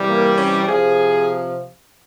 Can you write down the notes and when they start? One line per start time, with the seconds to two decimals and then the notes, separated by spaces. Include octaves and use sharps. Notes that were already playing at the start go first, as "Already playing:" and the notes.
Already playing: C3 E3 G3
0.09 A#3
0.38 C#4
0.67 C3 F3 G#4